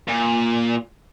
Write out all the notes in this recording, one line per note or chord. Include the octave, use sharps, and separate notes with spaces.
A#2